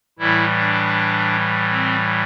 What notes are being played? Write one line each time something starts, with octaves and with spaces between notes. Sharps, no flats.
A2 E3 G3 E4
D4
C4